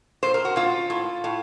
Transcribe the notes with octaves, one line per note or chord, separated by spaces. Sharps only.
A#2 C5
A#4
F#4
A#2 F4
A2
A2